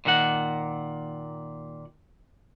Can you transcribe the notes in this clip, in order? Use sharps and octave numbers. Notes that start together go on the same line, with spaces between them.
A#2 D#3 A#3 F#5